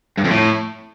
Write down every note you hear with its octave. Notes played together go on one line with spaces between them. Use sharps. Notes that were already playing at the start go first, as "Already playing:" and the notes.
G2
F2
A2